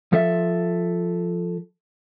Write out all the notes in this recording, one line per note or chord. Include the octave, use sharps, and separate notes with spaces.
F3 A4 E5